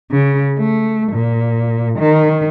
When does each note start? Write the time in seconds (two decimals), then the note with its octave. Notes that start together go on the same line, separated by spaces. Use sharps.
0.11 C#3
0.58 A3
1.12 A#2
1.99 D#3